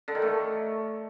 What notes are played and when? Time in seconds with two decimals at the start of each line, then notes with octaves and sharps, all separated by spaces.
0.08 D3
0.15 D#3
0.22 A3